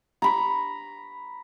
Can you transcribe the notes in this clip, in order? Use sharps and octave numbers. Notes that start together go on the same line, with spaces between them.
A#5 B5 C#6